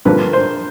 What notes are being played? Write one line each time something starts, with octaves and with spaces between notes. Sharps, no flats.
G2 D3 F3 A#3 B4
C5